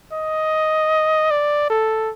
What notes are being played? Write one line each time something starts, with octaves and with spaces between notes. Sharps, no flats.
D#5
D5
A4